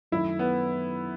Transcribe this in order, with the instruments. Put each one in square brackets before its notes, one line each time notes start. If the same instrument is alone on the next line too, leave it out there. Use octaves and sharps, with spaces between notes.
[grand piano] F#2 D#3 F#3 A3 D#4 [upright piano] E4
[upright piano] B3